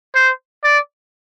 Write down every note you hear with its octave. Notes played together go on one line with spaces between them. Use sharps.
C5
D5